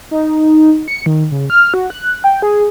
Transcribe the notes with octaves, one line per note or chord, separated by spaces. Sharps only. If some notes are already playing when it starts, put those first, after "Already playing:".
D#4
C#7
D#3
C#3
F6
F#4
F#6
G5
G#4